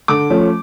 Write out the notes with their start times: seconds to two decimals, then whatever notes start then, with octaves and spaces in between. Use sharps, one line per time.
0.08 D3 D6
0.30 F3 A3 C#4